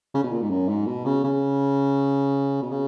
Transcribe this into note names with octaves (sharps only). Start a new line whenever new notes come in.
C#3
B2
A#2
G#2
F#2
G#2
B2
C#3
C#3
B2
C#3